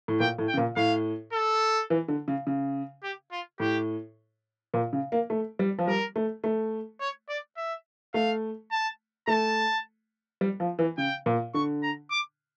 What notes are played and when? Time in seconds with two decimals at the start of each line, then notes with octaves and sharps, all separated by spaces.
0.08 A2
0.20 A#2 G5
0.38 A2
0.48 G5
0.54 C#3
0.57 A#2
0.76 A2 F5
1.33 A4
1.90 E3
2.08 D3
2.28 C#3
2.47 C#3
3.03 G4
3.32 F4
3.60 A2 G4
4.74 A#2
4.93 C#3
5.12 A#3
5.30 A3
5.59 G3
5.79 F3
5.87 G3 A#4
6.16 A3
6.44 A3
7.01 C#5
7.29 D5
7.57 E5
8.14 A3 F5
8.71 A5
9.27 A3 A5
10.41 G3
10.60 F3
10.79 E3
10.98 C#3 G5
11.26 A#2
11.54 D3 C#6
11.83 A#5
12.11 D6